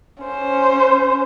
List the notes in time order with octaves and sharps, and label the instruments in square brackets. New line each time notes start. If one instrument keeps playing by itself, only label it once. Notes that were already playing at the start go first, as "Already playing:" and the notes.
[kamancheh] C#4 C5